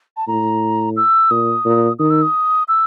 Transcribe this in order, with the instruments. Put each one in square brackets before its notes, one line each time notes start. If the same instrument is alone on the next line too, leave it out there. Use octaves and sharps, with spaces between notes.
[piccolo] A5
[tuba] A2 [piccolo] A#5
[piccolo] E6
[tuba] A#2 [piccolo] D#6
[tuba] A#2
[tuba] D#3 [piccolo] D#6
[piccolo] E6
D#6
E6